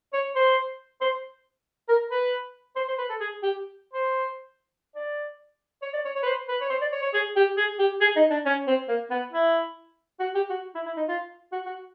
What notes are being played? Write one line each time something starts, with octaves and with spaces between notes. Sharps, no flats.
C#5
C5
C5
A#4
B4
C5
C5
B4
A4
G#4
G4
C5
D5
C#5
D5
C#5
C#5
B4
C5
B4
C#5
C5
D5
C#5
C#5
G#4
G4
G#4
G4
G#4
D#4
D4
C#4
C4
A#3
B3
E4
F#4
G4
F#4
E4
E4
D#4
F4
F#4
F#4